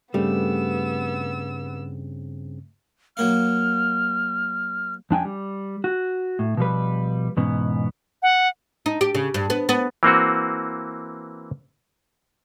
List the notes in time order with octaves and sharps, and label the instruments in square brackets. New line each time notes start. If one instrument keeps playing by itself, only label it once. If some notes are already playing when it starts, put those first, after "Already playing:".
[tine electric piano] G2 C#3 C4 [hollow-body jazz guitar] G3 [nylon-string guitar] A3 G4 [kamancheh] B3 E6
[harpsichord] F#3 A#3 F5 [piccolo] F6
[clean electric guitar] F2 D4 G5 G#5
G3
F#4
A2
B2 F3 G3 B4
E2 G#2 B2 B3 C#4
[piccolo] F#5
[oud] D#4
G4
C#3
G2
B3
B3
[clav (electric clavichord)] E3 A#3 C4 F#4